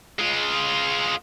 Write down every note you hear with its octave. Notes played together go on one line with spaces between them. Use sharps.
G#3 F4